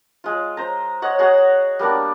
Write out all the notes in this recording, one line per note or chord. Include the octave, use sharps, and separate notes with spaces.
G#3 F4
C5 A#5
C#5 D#5 F#5
F#4 G#4 C#5 F#5
G3 A#3 B3 D4